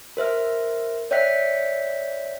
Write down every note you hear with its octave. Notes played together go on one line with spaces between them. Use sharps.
A#4 C5 E5 F6
C#5 D5 E5 G5 F#6 B6